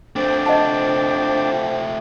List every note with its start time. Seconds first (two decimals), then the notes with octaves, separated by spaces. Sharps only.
0.16 A3 C4 D4 C5
0.46 C5 D#5 F#5 A5